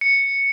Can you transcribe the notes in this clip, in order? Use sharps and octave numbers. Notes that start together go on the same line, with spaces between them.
C#7